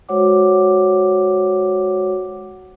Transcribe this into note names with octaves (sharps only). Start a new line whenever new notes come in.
G#3 F#4 C5 C#5 F#5 D6